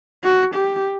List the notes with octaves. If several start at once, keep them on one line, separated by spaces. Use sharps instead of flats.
F#4
G4